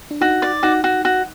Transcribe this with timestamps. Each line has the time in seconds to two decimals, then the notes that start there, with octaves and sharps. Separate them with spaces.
0.11 D4
0.21 D#4 F#4
0.42 D5
0.63 D#4 F#4
0.84 F#4
1.05 F#4